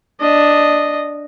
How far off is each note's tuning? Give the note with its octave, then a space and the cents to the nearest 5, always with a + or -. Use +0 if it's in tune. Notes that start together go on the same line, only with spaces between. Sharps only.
D4 +0 D#5 -5